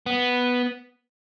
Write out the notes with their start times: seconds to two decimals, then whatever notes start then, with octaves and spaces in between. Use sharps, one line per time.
0.06 B3